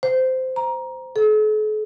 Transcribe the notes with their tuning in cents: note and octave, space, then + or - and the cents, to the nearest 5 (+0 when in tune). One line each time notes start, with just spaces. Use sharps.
C5 -15
A#5 +15
A4 -45